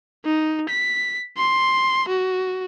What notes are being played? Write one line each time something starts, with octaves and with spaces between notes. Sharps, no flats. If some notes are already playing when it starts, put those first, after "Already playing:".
D#4
B6
C6
F#4